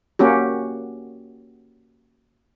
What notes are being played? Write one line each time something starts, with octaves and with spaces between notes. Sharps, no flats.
A#3 C#4 F#4 G4